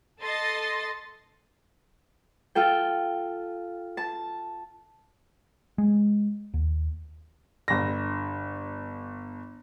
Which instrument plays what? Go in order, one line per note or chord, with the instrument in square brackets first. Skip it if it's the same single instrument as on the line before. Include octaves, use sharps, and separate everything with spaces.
[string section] A4 D#5 C6 A6
[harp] F4 A4 G5
A5
[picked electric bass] G#3
D#2
[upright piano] G1 A#6